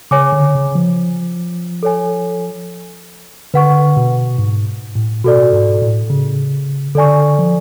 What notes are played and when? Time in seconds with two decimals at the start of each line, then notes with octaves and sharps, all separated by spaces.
0.11 C#3 C#5 G#5 D6
0.32 D3
0.55 C#3
0.75 F3
1.83 A4 C#5 G#5
3.54 D3 B4 F#5 C#6
3.97 B2
4.38 G#2
4.95 A2
5.24 B2 F#4 A4 D5
5.53 G#2
5.82 A2
6.10 C#3
6.95 D3 A4 D5 G#5 C#6
7.39 F3